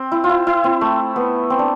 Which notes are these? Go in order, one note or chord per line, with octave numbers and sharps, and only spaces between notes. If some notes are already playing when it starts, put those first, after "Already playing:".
Already playing: C4
E4
F4
E4
E4
C4
A3
B3
C4
D4